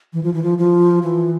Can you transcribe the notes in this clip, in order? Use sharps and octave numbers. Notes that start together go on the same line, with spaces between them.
E3
F3
E3
F3
F3
E3